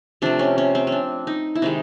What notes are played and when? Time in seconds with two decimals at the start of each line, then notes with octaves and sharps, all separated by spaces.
0.22 C3 F3 A3 D4
0.39 C#4
0.58 C#4
0.75 C4
0.87 C#4
0.92 D4
1.27 D#4
1.55 E4
1.62 C3 D#3 G#3 D#4